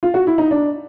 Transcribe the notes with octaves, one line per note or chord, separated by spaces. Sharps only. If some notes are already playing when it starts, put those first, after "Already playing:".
F4
F#4
E4
D#4
D4